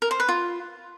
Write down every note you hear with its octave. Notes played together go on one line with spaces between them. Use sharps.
A#4
C5
B4
F4